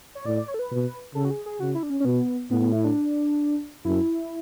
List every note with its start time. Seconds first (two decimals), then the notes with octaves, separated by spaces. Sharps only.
0.15 C#5
0.25 A2 D5
0.37 D5
0.48 C#5
0.54 A4
0.59 B4
0.71 B2
1.15 C#3 A4
1.25 F#4
1.31 G#4
1.46 G#4
1.60 C#3 F#4
1.75 E4
1.83 D4
1.90 C#4
2.00 C#4
2.05 B2 B3
2.51 A2 B3
2.61 B3
2.72 E4
2.84 D4
3.85 F#2 E4